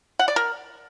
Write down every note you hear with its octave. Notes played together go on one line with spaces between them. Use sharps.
F#5
D5
A#4